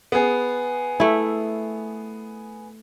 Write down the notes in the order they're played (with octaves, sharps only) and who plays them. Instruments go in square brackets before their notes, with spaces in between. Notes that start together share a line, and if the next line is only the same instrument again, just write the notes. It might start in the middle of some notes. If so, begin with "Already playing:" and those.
[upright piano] B3 G#4
[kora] A3 E4